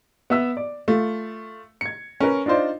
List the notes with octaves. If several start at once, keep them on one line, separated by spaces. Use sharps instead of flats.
B3 E5 E6
D5
A3 F4
G#6 C#7
C#4 A#4 B4
D4 D#4 F4 C5 D5